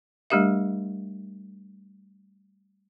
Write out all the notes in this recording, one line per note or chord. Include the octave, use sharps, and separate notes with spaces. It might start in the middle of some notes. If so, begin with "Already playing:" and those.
G3 A3 D4 G4 A#4 E5